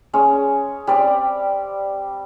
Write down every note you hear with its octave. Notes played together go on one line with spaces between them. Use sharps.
G#3 C#4 C#5
G3 C4 D5